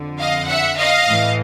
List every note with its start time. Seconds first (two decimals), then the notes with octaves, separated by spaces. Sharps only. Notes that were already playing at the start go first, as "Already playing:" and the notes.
Already playing: F2 D3
0.19 D#5 F5
0.48 E5 F#5
0.77 D#5 F5
1.07 A2 E3